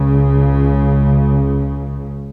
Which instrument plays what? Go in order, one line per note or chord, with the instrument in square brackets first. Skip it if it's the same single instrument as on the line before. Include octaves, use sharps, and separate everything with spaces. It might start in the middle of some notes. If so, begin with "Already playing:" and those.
Already playing: [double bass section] C#2 C#3